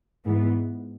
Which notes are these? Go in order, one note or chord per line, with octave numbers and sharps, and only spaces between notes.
G#2 E3 B3